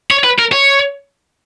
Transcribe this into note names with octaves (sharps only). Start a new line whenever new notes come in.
C#5
B4
A#4
C#5